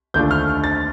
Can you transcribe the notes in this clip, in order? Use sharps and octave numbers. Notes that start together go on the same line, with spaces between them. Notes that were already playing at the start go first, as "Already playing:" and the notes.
D#2 D3 A3 D4 F4 G6
F6
A6